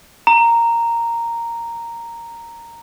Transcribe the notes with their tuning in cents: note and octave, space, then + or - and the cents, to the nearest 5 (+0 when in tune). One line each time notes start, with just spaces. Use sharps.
A#5 -5